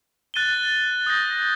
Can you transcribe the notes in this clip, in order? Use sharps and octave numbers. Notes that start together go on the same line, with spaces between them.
F#6 A6 D#7 G7
D#6 G6 A#6